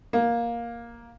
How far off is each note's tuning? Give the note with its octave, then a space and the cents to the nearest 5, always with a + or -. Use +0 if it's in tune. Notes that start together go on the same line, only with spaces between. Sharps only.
A#3 +10